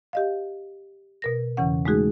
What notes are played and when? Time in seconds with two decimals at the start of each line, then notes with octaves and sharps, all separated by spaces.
0.13 G4 D#5 F5
1.22 B2 A#4 A#6
1.57 E2 C#3 E3 C#4 F#5
1.85 G#3 A3 D#4 F#4 G#4